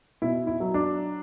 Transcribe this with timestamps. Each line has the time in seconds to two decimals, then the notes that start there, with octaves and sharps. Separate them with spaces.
0.22 B2 E4
0.47 E4
0.60 F#3
0.74 D4